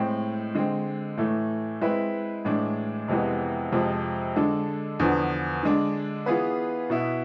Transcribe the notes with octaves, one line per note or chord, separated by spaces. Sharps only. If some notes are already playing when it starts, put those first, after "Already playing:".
Already playing: A2 G#3 C4
D3 G#3 C4
A2 E3 A3
G#3 C4 E4 B4
A2 E3 G#3 D4
F2 C3 E3 G#3 B3
F2 C3 F3 G#3
D3 G#3 D4 A4
E2 D3 F3 B3 D4
D3 G#3 D4
E3 B3 F4 G#4 B4
B2 B3 E4